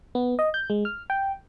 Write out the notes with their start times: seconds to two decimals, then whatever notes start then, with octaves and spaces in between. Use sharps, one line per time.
0.15 B3
0.39 D#5
0.54 G6
0.70 G#3
0.85 F6
1.10 G5